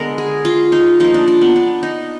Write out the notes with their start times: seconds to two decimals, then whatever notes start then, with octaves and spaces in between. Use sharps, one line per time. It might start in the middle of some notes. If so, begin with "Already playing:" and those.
Already playing: D3 G#3 B3 A#4
0.18 G#4
0.45 F4
0.72 D#4
1.00 F3 A#3 D#4
1.14 D4
1.28 D4
1.41 B3
1.56 D4
1.83 D#4